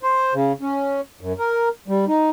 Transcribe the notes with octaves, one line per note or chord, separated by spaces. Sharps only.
C5
C#3
C#4
F#2
A#4
G3
D#4